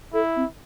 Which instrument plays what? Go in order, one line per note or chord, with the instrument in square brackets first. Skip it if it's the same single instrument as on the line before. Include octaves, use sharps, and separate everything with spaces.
[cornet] E4 [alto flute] A4
[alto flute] C4